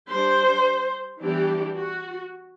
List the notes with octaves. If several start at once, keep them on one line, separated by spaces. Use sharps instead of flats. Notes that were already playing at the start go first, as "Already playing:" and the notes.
G3 D4 C5
E3 G3 B3 D4 G4
F#4